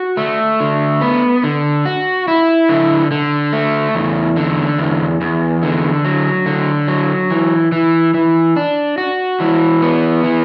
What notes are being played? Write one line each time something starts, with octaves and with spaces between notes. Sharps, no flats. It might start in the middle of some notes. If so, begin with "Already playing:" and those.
Already playing: F#4
A3
D3
B3
D3
F#4
E4
D3
D3
A3
E2
D3
E2
E2
D3
F#3
D3
F#3
E3
E3
E3
D4
F#4
E3
B3
E3